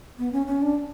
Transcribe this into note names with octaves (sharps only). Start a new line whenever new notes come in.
B3
C#4
C#4
D4